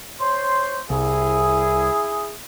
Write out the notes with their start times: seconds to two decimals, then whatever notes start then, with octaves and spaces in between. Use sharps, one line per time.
0.21 C5 C#5 C6
0.90 C2 E4 G#4